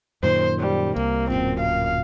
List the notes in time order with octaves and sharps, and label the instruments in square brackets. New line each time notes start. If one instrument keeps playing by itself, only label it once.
[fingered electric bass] F#2 A#2 D#3 [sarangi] C5
[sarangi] G3
[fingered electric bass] C2 [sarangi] A#3
[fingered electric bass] D1 F#2 A#2 [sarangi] C4
[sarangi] F5